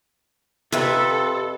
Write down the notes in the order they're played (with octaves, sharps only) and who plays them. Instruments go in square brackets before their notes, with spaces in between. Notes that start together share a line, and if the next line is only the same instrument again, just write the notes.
[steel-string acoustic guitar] F2 C3 [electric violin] A4 [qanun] B4 E5